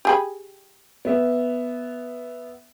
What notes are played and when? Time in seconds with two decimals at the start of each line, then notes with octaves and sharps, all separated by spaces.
0.05 G4 G#4 B5
1.05 B3 E5